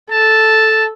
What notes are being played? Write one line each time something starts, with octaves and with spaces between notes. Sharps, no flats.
A4 A5